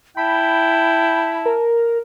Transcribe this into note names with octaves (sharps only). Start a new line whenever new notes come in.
E4 G5 A5 B5
A#4